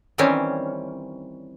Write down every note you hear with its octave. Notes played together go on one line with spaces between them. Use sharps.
D#3 E3 G3 C4 C#4